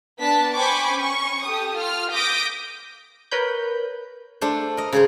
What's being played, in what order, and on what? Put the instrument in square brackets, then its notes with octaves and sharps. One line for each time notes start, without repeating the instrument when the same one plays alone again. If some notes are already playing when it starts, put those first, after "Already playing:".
[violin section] B3 D4 A5 B6
C5 G5 G#5 B5 C#6 D6
C#4 C#6
G4 A4 D#6
F4 F6
D6 D#6 G6 A#6 B6 D7
[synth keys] A#4 B4 C#5 B5 G6
[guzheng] A3 D4 C5
A#4 D#5
C#3 G#4 C5